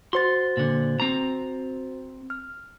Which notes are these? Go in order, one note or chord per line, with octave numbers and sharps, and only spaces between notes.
F#4 C5 C6 A6
A#2 D3
C4 A#5
F6